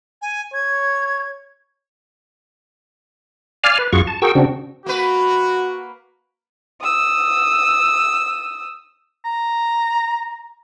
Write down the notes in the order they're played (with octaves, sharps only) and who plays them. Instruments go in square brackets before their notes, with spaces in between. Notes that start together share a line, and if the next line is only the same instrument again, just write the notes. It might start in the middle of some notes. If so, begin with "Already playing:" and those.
[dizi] G#5
[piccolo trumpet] C#5 [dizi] G#6
[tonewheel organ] D5 F5 G#5 F6
B4
F#2 F4 F#4 G#4 C#6
A5
F#4 G#4 A#4 G5 C#6 E6
C#3 C4 D4 F#4
[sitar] A#3 B4 [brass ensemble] F#4
[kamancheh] D#6 E6
[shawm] A#5